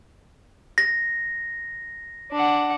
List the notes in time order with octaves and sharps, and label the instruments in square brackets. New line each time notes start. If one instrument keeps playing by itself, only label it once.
[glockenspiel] A#6
[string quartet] D4 F#5